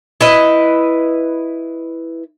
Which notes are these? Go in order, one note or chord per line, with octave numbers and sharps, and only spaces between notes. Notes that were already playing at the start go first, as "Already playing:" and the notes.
E4 B4 D#5